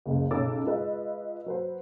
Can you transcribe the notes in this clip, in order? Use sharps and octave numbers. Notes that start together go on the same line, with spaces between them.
F#1 C#2
B1 C#3 C#5 D6 E6 A6
G#3 E4 F4 B4 D#5
F#3 B4 C5